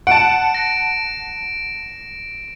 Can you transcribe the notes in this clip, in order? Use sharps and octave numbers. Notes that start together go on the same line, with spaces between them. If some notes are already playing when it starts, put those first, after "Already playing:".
F#5 A5 D7 E7
A#6